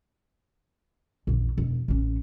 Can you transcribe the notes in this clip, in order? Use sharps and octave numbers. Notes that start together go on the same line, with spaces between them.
A#1 E2
E1
A1 C#4